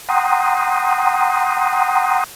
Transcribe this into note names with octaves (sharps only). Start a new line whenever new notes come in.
F#5 G5 A#5 C6 D#6